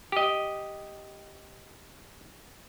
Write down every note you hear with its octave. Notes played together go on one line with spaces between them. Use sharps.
G4 D#5